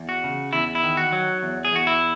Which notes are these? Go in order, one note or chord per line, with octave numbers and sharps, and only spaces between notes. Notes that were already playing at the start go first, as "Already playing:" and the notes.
Already playing: E2
F#4
C#3
E2 E4
E4
D#3
F#4
F#3
E2
G#4
E2 F#4
E4